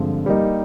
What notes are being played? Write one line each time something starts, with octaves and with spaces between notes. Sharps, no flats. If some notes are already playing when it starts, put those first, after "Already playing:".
Already playing: G2 D3 F3 G#3 C4
G3 A#3 D#4